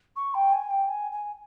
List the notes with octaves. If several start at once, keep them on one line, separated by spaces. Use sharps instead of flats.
C#6
G5
G#5
G5
G#5
G#5